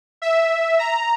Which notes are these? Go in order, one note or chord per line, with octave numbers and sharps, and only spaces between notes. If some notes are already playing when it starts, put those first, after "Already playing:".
E5
A#5